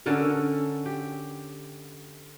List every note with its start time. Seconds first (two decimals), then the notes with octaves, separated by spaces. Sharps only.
0.06 D3 C#4 A4 A#4
0.86 G4